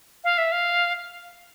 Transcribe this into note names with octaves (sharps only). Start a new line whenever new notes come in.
F5
E5
F5